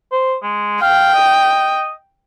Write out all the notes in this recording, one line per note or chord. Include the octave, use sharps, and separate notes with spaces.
C5
G#3
F5 G5
D#5